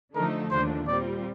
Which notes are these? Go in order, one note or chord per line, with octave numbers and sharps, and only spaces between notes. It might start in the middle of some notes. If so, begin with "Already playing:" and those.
D3 F3 A3 D#4 A4 A#4
D#2 D3 F3 A3 D4 C5
A#2 G3 C4 F4 D5